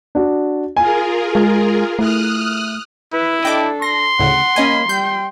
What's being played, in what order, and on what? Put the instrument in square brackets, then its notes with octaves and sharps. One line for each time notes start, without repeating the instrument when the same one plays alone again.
[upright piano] D4 F#4
[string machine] F4 G#4 A#4 [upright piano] G#5
[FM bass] G#3
[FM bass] A3 [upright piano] E4 [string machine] D#6 F6 F#6
[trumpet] E4 [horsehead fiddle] B4
[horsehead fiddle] D4 A4 [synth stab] D#5 G5 D6
[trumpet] C6 [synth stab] A#6
[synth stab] D2 A2 C#3 [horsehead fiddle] F#5
[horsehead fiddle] A#3 B5 [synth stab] C#4 D#5 G#5
[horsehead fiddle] G3 G5 [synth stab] G6